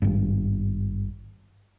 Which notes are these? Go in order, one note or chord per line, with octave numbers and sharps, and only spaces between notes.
G#1 G2